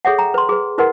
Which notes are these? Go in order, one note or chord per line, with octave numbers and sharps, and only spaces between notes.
G#4 A4 C#5 E5 F#5
G5 A#5
B4 C6
G#4 B4
E4 A#4 B4 D#5 F#5 C6